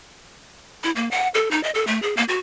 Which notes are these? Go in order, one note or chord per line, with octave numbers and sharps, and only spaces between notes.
E4
A#3
F#5
A4
D#4
D#5
A4
A3
G#4
A#3
F#4